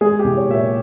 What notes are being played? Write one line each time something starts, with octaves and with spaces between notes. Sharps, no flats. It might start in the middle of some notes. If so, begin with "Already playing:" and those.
G#3 G#4
G4
C2
C#5
A#2 E5
C#5